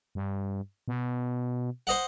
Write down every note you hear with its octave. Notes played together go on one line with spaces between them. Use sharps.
G2
B2
C5 D#5 F#5